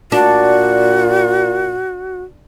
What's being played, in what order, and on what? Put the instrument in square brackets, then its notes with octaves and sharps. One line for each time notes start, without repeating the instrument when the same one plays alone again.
[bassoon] A#2 [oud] D4 [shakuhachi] F#4